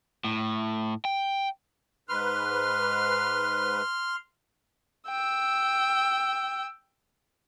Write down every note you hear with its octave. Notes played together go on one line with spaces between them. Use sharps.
A2
G5
G#2 B4 C6 F6
G5 E6